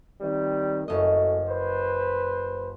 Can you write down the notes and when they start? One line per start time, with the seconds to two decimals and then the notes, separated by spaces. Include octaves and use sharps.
0.21 D#3 G3 C4
0.88 F#1 F#2 A3 D#5
1.48 B4 C5